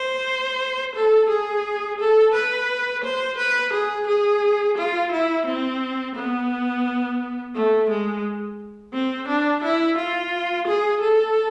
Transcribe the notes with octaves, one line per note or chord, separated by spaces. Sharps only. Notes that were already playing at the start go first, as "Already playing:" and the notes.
Already playing: C5
A4
G#4
A4
B4
C5
B4
G#4
G#4
F4
E4
C4
B3
A3
G#3
C4
D4
E4
F4
G#4
A4